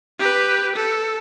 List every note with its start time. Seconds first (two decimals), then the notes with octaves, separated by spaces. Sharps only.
0.19 G4 B4
0.76 A4